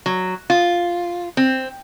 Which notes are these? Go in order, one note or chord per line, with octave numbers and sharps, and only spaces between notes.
F#3
F4
C4